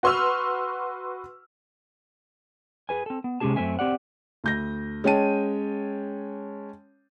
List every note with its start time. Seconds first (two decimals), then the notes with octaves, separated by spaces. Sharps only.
0.03 F#4 B4 C6 C#6 E6 F6
2.89 G#4 B4 G#5
3.06 C4 A4
3.24 B3
3.40 C3 G#3 C#4 G4 G#4 A5
3.56 F#2 A3 A#3 C4 E5 G#5
3.79 C4 G4 D5 F#5
4.44 D2 G6 A#6
5.04 G#3 C#4 C#5 G5 A5 D#7